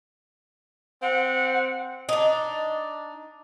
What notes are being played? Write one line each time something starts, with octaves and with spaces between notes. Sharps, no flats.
C4 F#5
D4 D#4